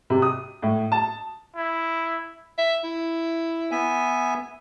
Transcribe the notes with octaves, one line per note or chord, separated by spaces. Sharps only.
C3
D#6
A2
A5
E4
E5
E4
B3 E5 G#5